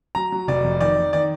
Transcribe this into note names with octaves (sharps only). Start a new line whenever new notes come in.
F#3 A#5
F#3
F1 D5
F2
D#3 D5
D#3
D#3 D5